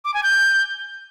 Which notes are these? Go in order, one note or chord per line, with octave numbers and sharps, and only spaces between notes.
D6
G#5
G6